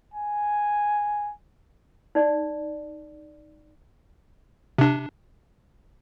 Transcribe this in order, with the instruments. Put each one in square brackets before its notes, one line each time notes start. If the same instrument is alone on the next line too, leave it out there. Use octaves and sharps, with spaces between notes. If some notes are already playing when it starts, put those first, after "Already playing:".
[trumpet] G#5
[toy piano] D#4 D5
[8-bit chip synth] C3 D4